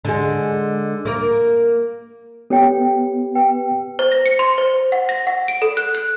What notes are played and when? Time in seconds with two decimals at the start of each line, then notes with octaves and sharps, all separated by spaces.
0.05 D3 G#3
1.05 A#3 A#4
2.50 B3 G4 A4 C#5 G5
3.35 B4 G5
3.99 C5
4.12 A#6
4.26 C#7
4.39 C6
4.58 C5
4.92 F#5
5.09 A#6
5.27 F#5
5.48 D7
5.62 A4
5.77 F#6
5.95 F#6